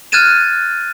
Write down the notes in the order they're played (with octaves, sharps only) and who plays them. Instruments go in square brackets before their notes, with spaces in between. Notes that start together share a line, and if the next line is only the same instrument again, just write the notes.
[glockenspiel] F6 F#6 G#6 A6 D#7 E7